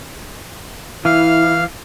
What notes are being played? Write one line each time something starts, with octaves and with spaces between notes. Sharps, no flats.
E3 E4 F5 F6